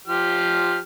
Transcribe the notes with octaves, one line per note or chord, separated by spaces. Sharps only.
F3 G4 F6